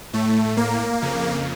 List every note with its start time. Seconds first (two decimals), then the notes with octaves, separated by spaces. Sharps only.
0.13 A2 A3
0.57 A#3
1.02 F2 C#3